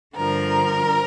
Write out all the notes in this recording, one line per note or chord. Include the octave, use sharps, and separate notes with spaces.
G2 D3 F3 A#4